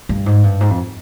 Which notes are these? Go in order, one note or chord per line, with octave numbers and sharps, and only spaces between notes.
G2
G#2
G2
G#2
F2